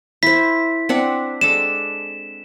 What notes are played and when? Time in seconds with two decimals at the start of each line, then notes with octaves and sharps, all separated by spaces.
0.23 E4 C5 B6
0.89 C4 D4 F#5
1.41 G#3 D4 A4 E7